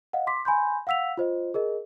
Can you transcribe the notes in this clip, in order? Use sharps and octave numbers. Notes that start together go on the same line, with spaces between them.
D#5 F5 F#5
C6 D6 B6
G#5 B5 C6 G6
F5 F#5 E6 B6 F7
F4 C5 D#5
G#4 A#4 D#5